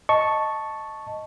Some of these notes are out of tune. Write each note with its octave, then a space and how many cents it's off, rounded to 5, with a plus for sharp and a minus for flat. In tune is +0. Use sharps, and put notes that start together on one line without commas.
D#5 +0 A5 +0 C#6 +0